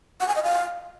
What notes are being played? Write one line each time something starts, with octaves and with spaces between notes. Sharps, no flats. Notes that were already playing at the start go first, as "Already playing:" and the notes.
F#5
G#5
D#5
F5